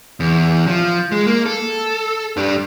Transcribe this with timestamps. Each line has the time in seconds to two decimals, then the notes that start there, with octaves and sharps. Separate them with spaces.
0.20 E2
0.67 F3
1.12 G#3
1.27 A#3
1.46 A4
2.37 G2 D4